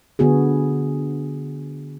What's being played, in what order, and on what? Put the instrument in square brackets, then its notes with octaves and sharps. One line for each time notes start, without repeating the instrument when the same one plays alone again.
[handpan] D3 B3 F#4 G#4